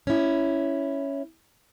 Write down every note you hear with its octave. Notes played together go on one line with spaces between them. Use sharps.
C#4 E4